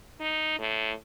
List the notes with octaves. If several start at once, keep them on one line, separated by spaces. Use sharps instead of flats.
D#4
A2